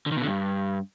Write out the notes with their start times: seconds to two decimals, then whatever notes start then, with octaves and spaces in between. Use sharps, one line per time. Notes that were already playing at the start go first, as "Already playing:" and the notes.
0.06 D3
0.11 D#3
0.17 B2
0.22 D3
0.27 G2